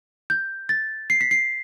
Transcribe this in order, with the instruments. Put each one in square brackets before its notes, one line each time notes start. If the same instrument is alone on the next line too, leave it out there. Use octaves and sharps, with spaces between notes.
[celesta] G6
A6
C7
B6
C7